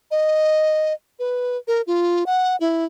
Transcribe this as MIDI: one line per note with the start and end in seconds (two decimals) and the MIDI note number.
0.11 0.93 75
1.19 1.57 71
1.68 1.82 70
1.87 2.24 65
2.26 2.56 78
2.60 2.85 64